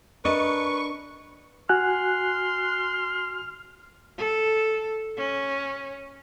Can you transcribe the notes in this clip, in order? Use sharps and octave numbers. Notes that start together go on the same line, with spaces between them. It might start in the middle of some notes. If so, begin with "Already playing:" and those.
D4 A#4 B4 D#5 C#6
F#4 G#5 C6 F6 F#6
A4
C#4